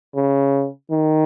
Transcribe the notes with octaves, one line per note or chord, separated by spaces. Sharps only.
C#3
D#3